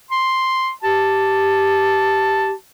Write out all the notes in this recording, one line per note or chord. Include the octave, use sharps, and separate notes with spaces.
C6
G4 A5